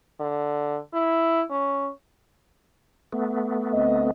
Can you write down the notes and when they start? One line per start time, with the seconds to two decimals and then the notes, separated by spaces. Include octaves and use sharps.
0.20 D3
0.93 E4
1.50 C#4
3.13 A3 B3
3.73 D2 C4 D#5